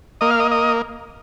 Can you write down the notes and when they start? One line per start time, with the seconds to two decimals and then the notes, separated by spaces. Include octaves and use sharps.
0.21 A#3 D#5
0.30 F5
0.40 D#5
0.51 D#5